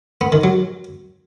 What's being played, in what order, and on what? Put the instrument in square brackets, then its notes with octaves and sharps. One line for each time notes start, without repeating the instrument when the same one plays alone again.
[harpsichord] B3
D#3
F#3